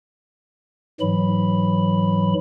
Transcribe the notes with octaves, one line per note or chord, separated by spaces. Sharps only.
G#2 E3 F#3 B5